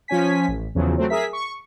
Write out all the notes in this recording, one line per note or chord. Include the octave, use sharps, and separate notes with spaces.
F3 C#4 G#5 B6
A1
E2 C#3 F3 F#3
F#3 A3 C4
G#4 A#4 E5 B6
C#6